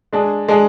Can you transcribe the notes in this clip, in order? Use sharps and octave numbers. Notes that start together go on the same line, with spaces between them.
G#3 D4 G#4
G#3 D4 G#4